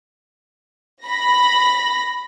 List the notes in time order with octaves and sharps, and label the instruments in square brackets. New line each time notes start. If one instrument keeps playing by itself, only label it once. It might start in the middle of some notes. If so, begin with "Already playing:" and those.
[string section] B5 A#6